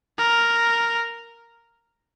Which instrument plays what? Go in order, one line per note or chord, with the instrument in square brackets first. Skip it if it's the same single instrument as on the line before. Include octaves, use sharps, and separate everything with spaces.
[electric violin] A#4